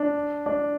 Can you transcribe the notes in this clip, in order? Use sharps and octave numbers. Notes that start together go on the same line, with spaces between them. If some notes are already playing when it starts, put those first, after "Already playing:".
Already playing: D4
D4